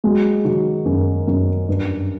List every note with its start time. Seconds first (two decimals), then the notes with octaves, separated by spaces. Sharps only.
0.04 F#3 G#3
0.45 D#3 F#3
0.85 F#2
1.27 F#2
1.69 G2